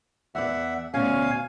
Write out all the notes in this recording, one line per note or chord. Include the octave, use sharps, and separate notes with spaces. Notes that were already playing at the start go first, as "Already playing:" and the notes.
E2 D5 E5 F#5
D2 B2 C#4 F5 G#5